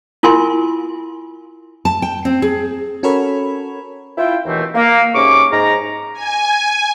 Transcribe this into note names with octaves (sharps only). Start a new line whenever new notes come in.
E4 F4 A#4 G#5 C6
A5
G5
C4
G#4
C#4 F#4 A4 A#4 C#5 B5
E4 F4 G5
D#2 B2 D#3 E3 A3 C4
A#3
G#2 C3 C#4 C#6 D6
G#2 A#5
G#5